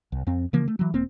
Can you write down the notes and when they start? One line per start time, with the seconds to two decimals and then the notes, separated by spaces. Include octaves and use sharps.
0.12 C2
0.27 F2 C4
0.53 C#3 E3 F3 A#3
0.68 A3
0.79 E3 F#3
0.94 E1 A#3 C4